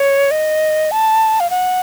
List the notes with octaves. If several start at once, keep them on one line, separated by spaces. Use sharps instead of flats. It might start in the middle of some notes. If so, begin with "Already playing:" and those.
Already playing: C#5
D#5
A5
F5
F#5